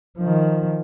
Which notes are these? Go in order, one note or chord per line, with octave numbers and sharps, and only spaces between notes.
D#3 F3